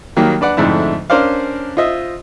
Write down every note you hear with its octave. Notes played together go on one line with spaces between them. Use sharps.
D#3 F#3 G3 A#3
D4 B4 D5 F#5
F2 G#2 D3 A3 D4 E4
C#4 D4 A#4 C5 D5 F5
F4 C5 D#5 E5